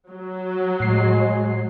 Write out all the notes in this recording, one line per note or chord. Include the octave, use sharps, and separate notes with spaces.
F#3
A2 G#3 C7